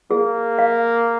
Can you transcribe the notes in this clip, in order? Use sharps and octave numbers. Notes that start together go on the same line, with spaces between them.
A#3 G#4
F5